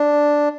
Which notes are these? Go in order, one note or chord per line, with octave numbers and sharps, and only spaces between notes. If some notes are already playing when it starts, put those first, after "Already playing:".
Already playing: D4